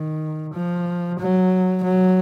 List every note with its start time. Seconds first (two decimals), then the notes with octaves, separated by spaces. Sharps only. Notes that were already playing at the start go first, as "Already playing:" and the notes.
Already playing: D#3
0.54 F3
1.19 F#3
1.83 F#3